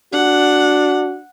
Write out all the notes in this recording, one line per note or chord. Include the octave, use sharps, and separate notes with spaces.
D4 F#4 F#5